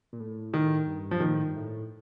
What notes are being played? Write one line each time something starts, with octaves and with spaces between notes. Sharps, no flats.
A#2
A2
D#3
G2
F3
A#2 D#3
A2
G2
A2